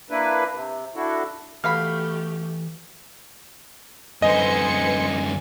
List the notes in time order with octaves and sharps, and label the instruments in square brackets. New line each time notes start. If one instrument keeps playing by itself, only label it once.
[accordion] A#3 D4 E4 B4
C3
D4 E4 F#4 A4
[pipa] B2 F5 B5 [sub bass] E3 [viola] A3 G4 [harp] F6
[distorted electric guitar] F#2 D3 [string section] B4 C5 C#7 [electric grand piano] D#5 [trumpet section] G#5